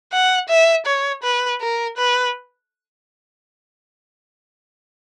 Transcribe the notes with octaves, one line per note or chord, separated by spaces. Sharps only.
F#5
E5
C#5
B4
A#4
B4